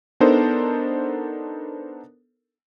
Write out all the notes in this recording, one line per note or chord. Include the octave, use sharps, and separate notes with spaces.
B3 D4 D#4 A4 A#4 C5